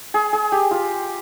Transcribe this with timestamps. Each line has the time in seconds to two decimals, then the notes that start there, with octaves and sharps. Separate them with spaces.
0.14 G#4
0.33 G#4
0.52 G4
0.71 F4